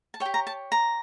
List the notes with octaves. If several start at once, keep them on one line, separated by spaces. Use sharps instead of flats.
A5
C#5 G5
G4
A#5
A5
A#5